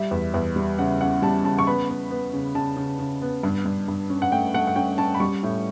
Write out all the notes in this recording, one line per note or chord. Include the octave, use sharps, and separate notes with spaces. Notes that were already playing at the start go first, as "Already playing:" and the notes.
Already playing: G3 E5
E2
E2
G3
C#3 F#5
C#4 F#5
G3 A5
C#3 A5
C#6
B3 B5
B3
B3
C#3
C#3 A5
C#3
C#3
B3
G2
G2
G2
C#4
F#5
A3 G5
A3 F#5
F#5
C#4 G5
C#4 A5
B5
G3 C#6
A2